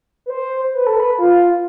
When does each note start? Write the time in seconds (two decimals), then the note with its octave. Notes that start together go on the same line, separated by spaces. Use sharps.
0.26 B4
0.30 C5
0.74 B4
0.87 A4
1.00 B4
1.18 F4